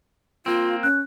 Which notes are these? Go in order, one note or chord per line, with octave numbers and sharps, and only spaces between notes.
A#3 C4 F4
C#4 F#6